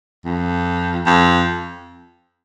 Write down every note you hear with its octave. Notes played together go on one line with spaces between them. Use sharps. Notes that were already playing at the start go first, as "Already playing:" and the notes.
F2
F2